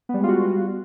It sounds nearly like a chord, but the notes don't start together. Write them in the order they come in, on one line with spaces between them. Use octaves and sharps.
B3 G3 G#3 F4 F#4